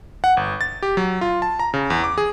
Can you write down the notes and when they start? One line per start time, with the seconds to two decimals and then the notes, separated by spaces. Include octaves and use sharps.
0.24 F#5
0.37 G1
0.61 A6
0.82 G4
0.97 F#3
1.21 F4
1.42 A5
1.60 A#5
1.74 C#3
1.90 E2
2.04 D6
2.18 G#4